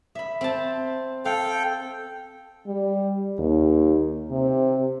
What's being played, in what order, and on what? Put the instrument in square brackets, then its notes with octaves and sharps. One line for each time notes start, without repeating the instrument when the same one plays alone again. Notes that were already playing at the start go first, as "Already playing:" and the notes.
[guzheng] E5 B5
C4 A5
[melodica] A4 G5 [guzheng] F5
[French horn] G3
D#2
C3